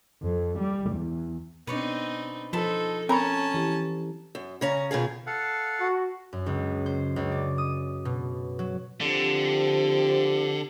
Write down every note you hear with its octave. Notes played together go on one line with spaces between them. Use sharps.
F2
G3
E2
B2 C4 D4 D#4 B4 C#5 D5
F3 D#4 A4 B4 A5 C6
C4 C#4 A4 A#4 C#5 A5 B5
E3 G4
F#2
C#3 C#4 A#5
B2 D#3 F4 G#4
A4 F5 F#5
F#4
F#2
C#2
C5
C#2
D5
D#6
B2
F#3
D3 F3 C4 G4